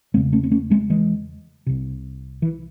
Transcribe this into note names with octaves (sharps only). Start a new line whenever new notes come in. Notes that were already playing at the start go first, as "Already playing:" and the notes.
E2 C#3 G#3 C4
A3 C#4
C4
A3 C#4
G#3 C4
E3 G#3
C2 C3
E3